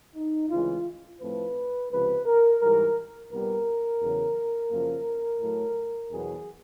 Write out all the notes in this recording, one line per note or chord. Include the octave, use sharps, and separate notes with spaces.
D#4
D2 C#3 E3 G#3 F4
A2 F3 A3 C4 B4
C#2 C3 F3 B4
A#4
G#2 E3 G3 A#4
C2 A#2 G3 B3 A#4
E2 C#3 F#3
F#2 C#3 F3 A#3
A2 F#3 A3
E2 B2 F#3 B3 G#4